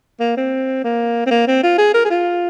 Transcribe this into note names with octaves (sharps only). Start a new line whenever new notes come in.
A#3
C4
A#3
C4
A#3
C4
F4
G#4
A#4
G#4
F4